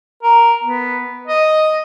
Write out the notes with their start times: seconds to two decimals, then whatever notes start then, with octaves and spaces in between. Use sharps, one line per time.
0.23 A#4
0.63 B3
1.27 D#5